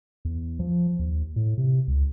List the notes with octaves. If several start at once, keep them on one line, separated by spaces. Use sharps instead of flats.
E2
F3
D#2
A2
C3
C#2